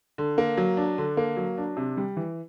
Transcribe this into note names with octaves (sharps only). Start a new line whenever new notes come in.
D3
A#3
F#3
D4
D3
A#3
F#3
D4
C3
G3
E3